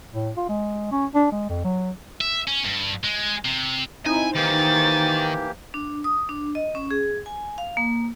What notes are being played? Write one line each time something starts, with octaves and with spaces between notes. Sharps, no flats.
A2
F4
G#3
C#4
D4
G#3
F2
F#3
E5
C#4
G2
G#3
C3
C4 D#4 E4 G#5
D#3 E3 A#3 G4 C5 A6
D4
D#6
D4
D#5
C#4
G#4
G#5
F5
A#3